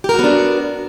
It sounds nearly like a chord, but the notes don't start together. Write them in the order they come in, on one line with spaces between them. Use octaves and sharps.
G4 A#4 F#4 B3 D4